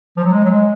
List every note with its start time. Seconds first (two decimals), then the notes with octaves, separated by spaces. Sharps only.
0.17 F3
0.24 F#3
0.32 G#3
0.44 F#3
0.50 G#3